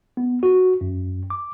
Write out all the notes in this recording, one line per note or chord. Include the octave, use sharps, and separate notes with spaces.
B3
F#4
F#2
D6